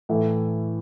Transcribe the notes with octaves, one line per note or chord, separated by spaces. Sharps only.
A2 E3 A3 E4